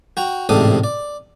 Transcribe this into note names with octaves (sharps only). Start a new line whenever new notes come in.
F#4 G5 A#5
A1 G#2 C3 A4 D5 D#6
D5